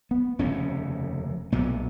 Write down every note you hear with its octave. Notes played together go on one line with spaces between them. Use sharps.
B3
F1 D#2 C#3 C#4
B1 A#2 B3